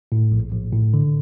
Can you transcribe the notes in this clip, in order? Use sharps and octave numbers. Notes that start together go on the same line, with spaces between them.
A2
A#1
A#1
A2
D3